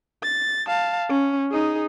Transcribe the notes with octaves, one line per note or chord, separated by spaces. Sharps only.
A6
F5 A5
C#4
D#4 G#4